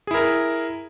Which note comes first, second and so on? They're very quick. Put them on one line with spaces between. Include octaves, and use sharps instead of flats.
G#4 E4 A#4